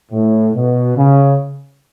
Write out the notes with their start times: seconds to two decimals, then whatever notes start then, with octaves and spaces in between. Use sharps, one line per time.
0.12 A2
0.55 B2
0.97 C#3